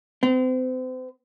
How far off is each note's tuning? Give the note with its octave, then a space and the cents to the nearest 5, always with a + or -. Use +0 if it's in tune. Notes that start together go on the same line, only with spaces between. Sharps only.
C4 -35